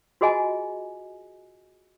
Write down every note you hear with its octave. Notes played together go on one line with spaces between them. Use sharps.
F4 F#4 G#4 D#5 G#5